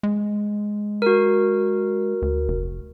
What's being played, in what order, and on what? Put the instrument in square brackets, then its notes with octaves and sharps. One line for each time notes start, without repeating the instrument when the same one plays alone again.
[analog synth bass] G#3
[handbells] F#4 A#4
[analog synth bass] D2
F1